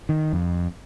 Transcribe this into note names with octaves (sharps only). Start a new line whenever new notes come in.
D#3
F2